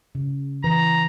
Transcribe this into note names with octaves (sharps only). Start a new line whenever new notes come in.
C#3
E3 B4 A#5